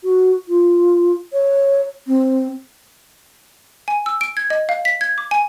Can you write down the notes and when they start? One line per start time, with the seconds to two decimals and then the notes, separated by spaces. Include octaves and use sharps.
0.04 F#4
0.48 F4
1.33 C#5
2.07 C4
3.88 G#5
4.06 E6
4.21 D7
4.37 G#6
4.50 D#5
4.69 F5
4.85 B6
5.01 G#6
5.18 D6
5.31 G#5